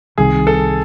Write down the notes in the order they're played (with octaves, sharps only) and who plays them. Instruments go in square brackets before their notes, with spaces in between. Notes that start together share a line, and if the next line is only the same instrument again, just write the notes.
[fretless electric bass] C2 C3 D#3 G3 [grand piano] G#4
[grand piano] A4